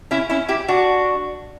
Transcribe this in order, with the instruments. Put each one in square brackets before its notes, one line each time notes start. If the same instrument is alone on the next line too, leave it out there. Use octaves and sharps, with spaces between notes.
[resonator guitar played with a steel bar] C#4 E4
C#4 E4
E4 G4
D4 F#4